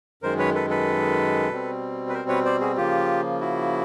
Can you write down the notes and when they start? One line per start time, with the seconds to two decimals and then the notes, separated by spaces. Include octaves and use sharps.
0.22 F#2 D#3 G#3 A#4 C5
0.39 B4 C#5
0.55 A4 B4
0.70 A4 B4
1.50 B2 G3 C4
2.10 B4
2.13 A#4 C5
2.29 B4 C#5
2.45 C5 D5
2.61 F#4 G#4
2.76 C#3 F3 A#3 F4 G4
3.40 E4 F#4